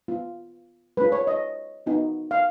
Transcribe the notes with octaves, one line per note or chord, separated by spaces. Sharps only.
B3 F4
G#3 C#4 F4 B4
C#5
D#5
B3 D#4 F#4
F5